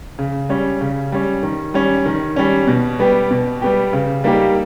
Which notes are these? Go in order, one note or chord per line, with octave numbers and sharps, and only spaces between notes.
C#3
G3 C#4
C#3
G3 C#4
D#3
G3 C#4
D#3
G3 C#4
B2
G3 B3 G4
B2
G3 B3 G4
C#3
G3 A#3 D#4 G4